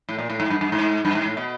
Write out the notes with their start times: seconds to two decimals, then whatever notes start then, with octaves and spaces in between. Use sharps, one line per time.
0.09 A2
0.19 A#2
0.30 A2
0.40 G#2
0.50 G2
0.61 G2
0.72 G#2
1.05 G2
1.15 G#2
1.26 A2
1.37 B2